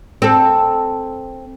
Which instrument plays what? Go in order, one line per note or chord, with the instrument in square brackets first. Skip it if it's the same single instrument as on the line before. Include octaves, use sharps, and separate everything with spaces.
[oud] C4 A4